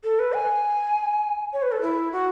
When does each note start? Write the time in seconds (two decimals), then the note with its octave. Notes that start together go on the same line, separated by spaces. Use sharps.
0.04 A4
0.19 B4
0.35 G#5
1.53 C#5
1.62 B4
1.72 A4
1.82 E4
2.12 F#4